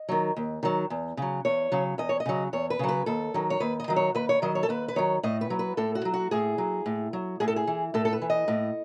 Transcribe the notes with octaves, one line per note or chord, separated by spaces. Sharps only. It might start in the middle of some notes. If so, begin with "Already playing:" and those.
Already playing: D#5
D#3 F#3
D#2
D#3 F#3
E2
C#3 F#3
E2 C#5
C#3 F#3
E2 D#5
C#5
D#5
C#3 F#3
E2 C#5
B4
C#3 F#3
B4
D#2 A4
D#3 F#3
C#5
D#2 B4
D#5
D#3 F#3
C#5
D#2 B4
C#5
D#3 F#3 D#5
C#5
A4
D#2 B4
B4
D#3 F#3 C#5
A2 D#5
B4
F#3
B4
A2 A4
F#4
F#3
F#4
A2 G#4
F#3
A2
F#3
A2 G#4
A4
G#4
E3
A2 A4
A4
B4
E3
D#5
A2